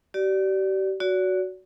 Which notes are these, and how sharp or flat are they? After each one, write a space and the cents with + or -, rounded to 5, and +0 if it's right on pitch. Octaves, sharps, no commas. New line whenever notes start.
G4 -40 D5 +0
F#4 +0 D5 -40